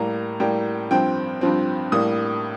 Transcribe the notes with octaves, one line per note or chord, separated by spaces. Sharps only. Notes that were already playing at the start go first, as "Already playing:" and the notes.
Already playing: A2 G3 A#3 A#5
A2 G3 A#3 G5
G2 F3 C4 G5
G2 F3 C4
A2 G3 A#3 D#6